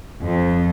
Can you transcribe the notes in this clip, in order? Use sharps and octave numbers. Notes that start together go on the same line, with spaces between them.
F2